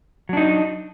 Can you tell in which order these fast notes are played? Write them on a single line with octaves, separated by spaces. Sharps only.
F#3 D4 D#4